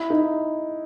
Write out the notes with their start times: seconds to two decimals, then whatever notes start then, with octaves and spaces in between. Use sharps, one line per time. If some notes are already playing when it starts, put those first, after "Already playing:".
Already playing: E4
0.10 D#4